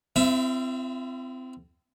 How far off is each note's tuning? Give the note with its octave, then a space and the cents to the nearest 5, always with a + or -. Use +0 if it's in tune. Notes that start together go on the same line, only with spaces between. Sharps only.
C4 -25 E4 +45 E5 +0